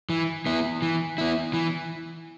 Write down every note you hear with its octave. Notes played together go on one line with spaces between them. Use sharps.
E3
B3 E4
E3
B3 E4
E3